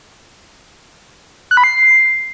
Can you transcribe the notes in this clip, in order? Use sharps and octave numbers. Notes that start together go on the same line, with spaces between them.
F#6
B5
C7